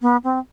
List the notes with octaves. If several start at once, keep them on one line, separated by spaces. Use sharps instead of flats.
B3
C4